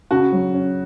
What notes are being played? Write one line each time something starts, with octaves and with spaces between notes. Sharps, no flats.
C#3 F#4
F#3
C#4